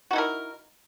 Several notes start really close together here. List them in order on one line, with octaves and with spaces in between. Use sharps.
F#4 D#4 E4 A#4